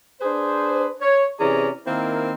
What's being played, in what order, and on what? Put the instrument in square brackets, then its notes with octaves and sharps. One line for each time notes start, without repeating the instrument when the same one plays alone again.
[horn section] D4 G#4 B4 C5
C#5
C3 E3 C#4 G#4 D5 A#5
D#3 A#3 C4 E4 A#4